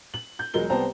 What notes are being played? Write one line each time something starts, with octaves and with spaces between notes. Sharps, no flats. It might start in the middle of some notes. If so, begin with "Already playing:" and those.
F#7
G6
E1 F#3 G#3 A#4 G7
C2 B3 C5 G5 A5 A#5